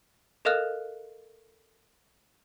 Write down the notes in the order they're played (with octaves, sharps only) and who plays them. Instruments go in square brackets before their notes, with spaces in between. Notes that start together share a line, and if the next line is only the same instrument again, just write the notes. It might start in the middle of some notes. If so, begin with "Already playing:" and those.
[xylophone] A4 A#4 D#5 F5 F6 F#6